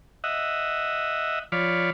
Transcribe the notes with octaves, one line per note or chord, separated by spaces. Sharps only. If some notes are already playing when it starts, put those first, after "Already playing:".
D#5 E5 F#5
F3 C#5 D5 F5 B5